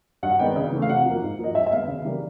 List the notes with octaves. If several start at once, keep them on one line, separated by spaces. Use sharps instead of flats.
G2 F#5
D#3 G#3 B3 D4 G5
C#3
E3 A3
F5
C3 F#5
F3 A#3
G#2
F3 A#3 D#5
G2 E5
E5
D#3 G#3 B3 F5
C#3
E3 G3 A#3 D4